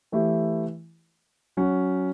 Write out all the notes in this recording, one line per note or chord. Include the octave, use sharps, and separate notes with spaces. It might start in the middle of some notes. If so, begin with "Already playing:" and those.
E3 A3 E4 G4
F#3 C#4 F#4